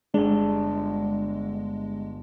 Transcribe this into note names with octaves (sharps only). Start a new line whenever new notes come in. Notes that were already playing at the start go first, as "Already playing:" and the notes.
G1 G#3 D4